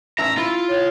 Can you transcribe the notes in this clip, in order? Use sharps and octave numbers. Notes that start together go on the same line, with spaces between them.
A1 E5 A#5 E6
E4 F4
C#5